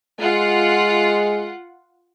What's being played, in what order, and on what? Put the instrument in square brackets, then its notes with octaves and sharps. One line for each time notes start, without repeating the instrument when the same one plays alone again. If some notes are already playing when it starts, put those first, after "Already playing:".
[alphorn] G#3 [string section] F4 F#5